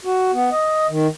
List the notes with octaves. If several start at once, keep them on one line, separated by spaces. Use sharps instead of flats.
F#4
B3
D#5
D#3